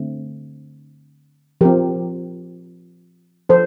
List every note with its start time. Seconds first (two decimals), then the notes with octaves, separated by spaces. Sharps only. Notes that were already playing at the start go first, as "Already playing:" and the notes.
Already playing: D3 A3 C4
1.61 F3 C4 G4 A#4
3.49 F3 A4 C5